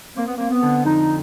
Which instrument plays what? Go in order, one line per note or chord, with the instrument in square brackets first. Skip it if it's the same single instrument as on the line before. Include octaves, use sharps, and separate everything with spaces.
[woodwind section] A#3 [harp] C4
[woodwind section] B3
[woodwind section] A#3 [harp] C4
[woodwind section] B3
[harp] D3
[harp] F2 [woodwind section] D#4